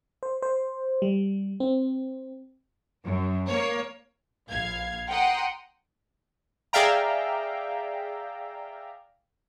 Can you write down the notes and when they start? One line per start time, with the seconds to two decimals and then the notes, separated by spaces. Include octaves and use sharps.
0.23 C5
0.42 C5
1.02 G3
1.60 C4
3.03 F#2
3.47 A#3 C#5
4.48 A#1 F5 G#6
5.10 F#5 G5 A#5 C6 D#6
6.73 G#4 D5 E5 F5 G5 A#5